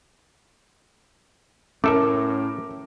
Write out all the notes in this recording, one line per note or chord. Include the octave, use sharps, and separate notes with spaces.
A2 A3 C#4 A4 A#4 E5 D6